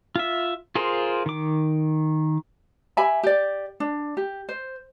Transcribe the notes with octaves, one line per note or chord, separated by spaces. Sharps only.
F4 E5
F4 G#4 A#4 C5
D#3 D6
G4 E5 G#5 B5
G4 D5
D4
G4
C5